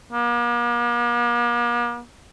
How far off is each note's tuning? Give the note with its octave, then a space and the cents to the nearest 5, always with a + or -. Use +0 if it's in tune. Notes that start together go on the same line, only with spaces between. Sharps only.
A#3 +45